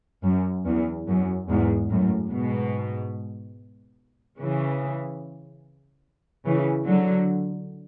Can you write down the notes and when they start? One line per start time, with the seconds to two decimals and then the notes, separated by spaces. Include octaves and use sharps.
0.24 F#2
0.66 E2
1.08 F#2
1.48 E2 G#2
1.90 F#2 A2
2.31 G#2 B2
4.38 C#3 E3
6.46 C#3 E3
6.87 D3 F#3